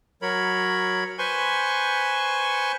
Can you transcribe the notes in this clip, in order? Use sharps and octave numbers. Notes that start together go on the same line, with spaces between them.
F#3 A#4 C#5 B5
B4 C5 G#5 C6 C#6